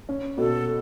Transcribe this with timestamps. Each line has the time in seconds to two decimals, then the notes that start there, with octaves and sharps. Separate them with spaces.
0.09 C#4
0.38 B2 A4